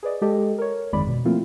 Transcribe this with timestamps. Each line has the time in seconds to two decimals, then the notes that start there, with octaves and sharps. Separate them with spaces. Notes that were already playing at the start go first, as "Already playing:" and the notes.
0.03 G#4 B4 D5 D#5
0.21 G#3 G4 A4 D#5
0.58 A#4 C#5
0.93 G1 F2 D#3 G#3 D5 B5
1.07 B2
1.25 F3 A3 A#3 C4 E4 F4